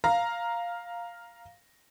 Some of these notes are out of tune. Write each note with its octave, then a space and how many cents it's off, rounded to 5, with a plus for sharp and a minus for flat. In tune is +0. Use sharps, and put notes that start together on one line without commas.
F5 +0 A#5 +0